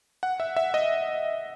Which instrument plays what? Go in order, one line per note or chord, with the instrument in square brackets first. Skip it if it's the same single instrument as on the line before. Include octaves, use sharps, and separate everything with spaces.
[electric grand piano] F#5
E5
E5
D#5